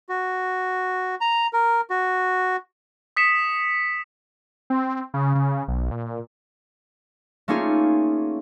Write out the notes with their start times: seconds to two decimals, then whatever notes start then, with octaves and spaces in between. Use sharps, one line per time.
0.09 F#4
1.21 A#5
1.53 A#4
1.90 F#4
3.16 D#6 B6 C#7 E7
4.70 C4
5.14 C#3
5.35 C#3
5.68 B1
5.91 A#2
7.48 A3 A#3 C#4 D#4 F4 G#4